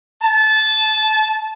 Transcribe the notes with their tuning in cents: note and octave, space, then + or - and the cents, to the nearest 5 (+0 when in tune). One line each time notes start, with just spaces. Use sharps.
A5 -20